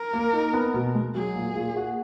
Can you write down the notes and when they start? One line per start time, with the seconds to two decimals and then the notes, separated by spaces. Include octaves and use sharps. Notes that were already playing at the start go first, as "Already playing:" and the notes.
Already playing: A#4
0.13 A#3
0.33 D#4
0.54 B3
0.74 B2
0.95 G#3
1.14 F#3 G#4
1.35 A#2
1.56 A#2
1.76 F#4